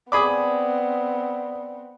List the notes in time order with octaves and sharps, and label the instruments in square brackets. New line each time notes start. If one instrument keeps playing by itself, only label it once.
[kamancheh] B3 C4 [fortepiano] G#4 B5 D6 [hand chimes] D5 D#6